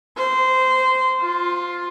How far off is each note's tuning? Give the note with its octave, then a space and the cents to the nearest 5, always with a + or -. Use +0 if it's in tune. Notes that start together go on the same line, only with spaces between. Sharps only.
C5 -15
F4 +10